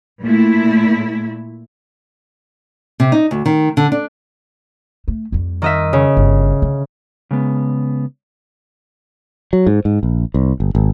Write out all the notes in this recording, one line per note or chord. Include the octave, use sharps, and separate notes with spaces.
A#2 A3 E4
C3
D#4
D2
D#3
D3
D4
A3
F2 G3
D#3 D#5 E5
C#3
G1
D3 C#4
C#3 G#3 B3
F#3
G#2
G#2
A#1
C2
G1
G#1